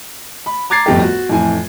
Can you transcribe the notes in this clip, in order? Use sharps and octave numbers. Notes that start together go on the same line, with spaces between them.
B5
A#5 D6 G#6 A6 C7
G1 F2 A2 G4
F#4
F2 A2 E3 G#5